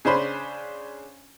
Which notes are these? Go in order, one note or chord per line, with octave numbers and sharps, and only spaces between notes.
C#3 C#4 D4 C5 B5